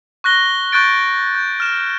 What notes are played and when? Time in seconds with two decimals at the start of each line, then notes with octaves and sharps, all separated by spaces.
0.24 C#6 F#6 A#6 G7
0.72 C#6 F#6 G6 A6 D7
1.35 G6
1.60 F6 E7